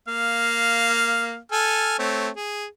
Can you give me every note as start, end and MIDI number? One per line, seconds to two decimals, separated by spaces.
0.08 1.37 58
0.08 1.37 77
1.52 1.99 69
1.52 1.99 80
1.52 1.99 89
1.99 2.29 57
1.99 2.29 60
1.99 2.29 73
2.36 2.66 68